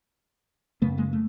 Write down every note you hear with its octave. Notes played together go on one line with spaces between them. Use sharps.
F#2 C#3 A3 B3
G#3 A#3
A3